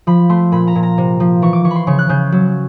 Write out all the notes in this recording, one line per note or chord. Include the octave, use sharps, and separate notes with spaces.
F3 B5
A3 C6
A#2 B5
A#5
A#2
A#5
C3
F3
E3 C#6
D6
E3 C#6
B5 C6
C#3 C#6
F#6
C#3 G6
F#3